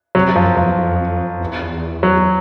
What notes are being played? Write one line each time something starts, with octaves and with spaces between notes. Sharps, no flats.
C3 F#3
F#2 F3
E2 F3
F2
E2
F#3